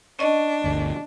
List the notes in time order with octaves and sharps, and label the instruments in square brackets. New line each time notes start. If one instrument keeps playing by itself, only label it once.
[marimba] C#4 D#5 [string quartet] D4
[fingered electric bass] G1 D2